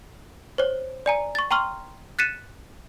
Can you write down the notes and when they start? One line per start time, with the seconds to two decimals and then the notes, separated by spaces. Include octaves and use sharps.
0.58 C5 C#5
1.06 D5 G#5 A#5
1.35 C#6 A6
1.51 G5 A#5 C6 C#6 F6
2.19 F#6 A6 B6 C#7 D#7 E7